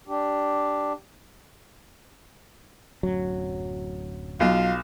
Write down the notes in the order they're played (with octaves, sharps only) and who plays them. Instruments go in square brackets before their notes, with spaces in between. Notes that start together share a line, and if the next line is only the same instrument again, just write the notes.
[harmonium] D4 G4
[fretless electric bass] D1 F#2 F#3
[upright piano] B1 [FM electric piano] F#3 [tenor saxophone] F4